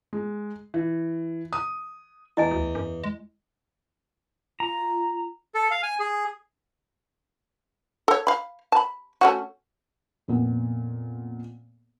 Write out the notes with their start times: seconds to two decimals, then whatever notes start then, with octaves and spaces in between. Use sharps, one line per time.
0.13 G#3
0.74 E3
1.53 D#6
2.37 E2 E4 D#5 G#5
2.51 D2
2.75 F#2
3.04 G#3
4.60 F4 A#5
5.55 A4
5.71 F5
5.83 G#5
6.00 G#4
8.08 A4 C#5
8.27 F5 B5
8.72 A5 B5
9.21 A3 C#4 F#4
10.28 F2 A#2 B3